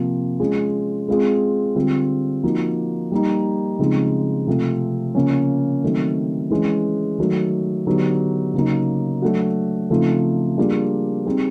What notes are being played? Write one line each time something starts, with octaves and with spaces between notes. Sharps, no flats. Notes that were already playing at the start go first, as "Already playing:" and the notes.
Already playing: C3 F3 A#3
G#3 C#4 F4 G#4
G#3 C4 F4 G#4
D3 G3 C4 F4
F3 A#3 D#4 F#4
G3 A#3 D#4
C#3 F3 G#3 C4 D#4
C3 F3 A3 C4
C#3 F3 A#3 C#4
D#3 F#3 A3 C4
E3 G#3 C#4
D#3 F#3 A3
D3 F#3 B3 D#4 G4
C#3 F#3 A#3 D#4
F#3 A3 D4 F#4
C#3 F3 A3 C4 D#4
G3 A#3 D4 F4 G#4
G3 C4 D#4 G#4